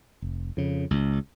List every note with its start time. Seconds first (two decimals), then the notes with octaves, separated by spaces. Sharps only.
0.22 F1
0.57 F2 C#3
0.91 C#2